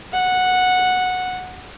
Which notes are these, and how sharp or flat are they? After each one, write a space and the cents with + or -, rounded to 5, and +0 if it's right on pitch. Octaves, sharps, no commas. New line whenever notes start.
F#5 -10